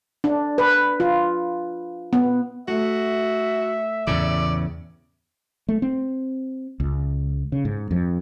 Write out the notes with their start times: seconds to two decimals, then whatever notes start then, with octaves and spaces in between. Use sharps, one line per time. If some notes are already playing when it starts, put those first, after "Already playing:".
0.24 D4
0.58 B4
1.00 F4
2.13 B3
2.68 A3 F#4 E5
4.07 E2 A2 C#3 D5
5.69 A3
5.82 C4
6.80 C#2
7.52 C#3
7.65 G#2
7.91 F2